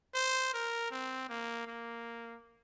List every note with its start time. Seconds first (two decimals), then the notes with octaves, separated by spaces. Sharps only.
0.15 C5
0.54 A#4
0.91 C4
1.29 A#3
1.67 A#3